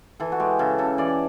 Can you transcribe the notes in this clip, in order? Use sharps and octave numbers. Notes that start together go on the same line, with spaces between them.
E3 A4
F#4
G#3 G4
C#3 A4
C#3 A4
E3 D5